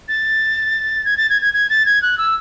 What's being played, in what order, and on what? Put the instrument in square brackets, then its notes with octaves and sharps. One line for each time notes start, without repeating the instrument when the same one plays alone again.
[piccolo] A6
G#6
A6
G#6
G#6
G#6
A6
G#6
F#6
E6